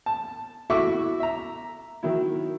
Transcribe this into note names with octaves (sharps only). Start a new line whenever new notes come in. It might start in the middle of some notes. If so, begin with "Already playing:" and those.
A5
E4 F#4 A4 E5 C#6 D6
E5 A#5
D#3 F#3 E4